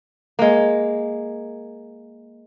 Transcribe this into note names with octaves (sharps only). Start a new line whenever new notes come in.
G#3 A#3